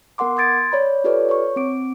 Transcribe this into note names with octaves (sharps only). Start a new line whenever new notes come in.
B3 A#4 F#5 C6 D6
C6 D#6 G#6 A6 D7
C#5 D5 B5
F4 G4 A4 B4 C#5 D5
C#5 C#6
C4 D6 D7